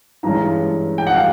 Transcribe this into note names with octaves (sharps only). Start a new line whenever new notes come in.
G2 E3 G#3 C#4 A#5
G5
F#5
F5